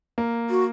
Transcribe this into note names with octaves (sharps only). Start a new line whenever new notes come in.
A#3
F#4